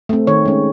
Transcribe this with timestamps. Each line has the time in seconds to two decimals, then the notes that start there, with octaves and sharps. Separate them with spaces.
0.09 A3 C4
0.27 D#3 C#5
0.45 G#3 C#4